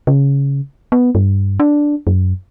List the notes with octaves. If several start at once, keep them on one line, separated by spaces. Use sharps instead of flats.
C#3
B3
G2
D4
F#2